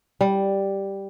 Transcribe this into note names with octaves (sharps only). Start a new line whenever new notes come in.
G3